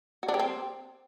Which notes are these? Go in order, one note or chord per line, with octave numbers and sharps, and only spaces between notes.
F#4
D4
G4
C4